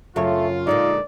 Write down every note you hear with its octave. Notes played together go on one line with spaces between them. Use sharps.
F#2 C#3 A3 F4 C#5
A#2 D3 G#3 D#4 D5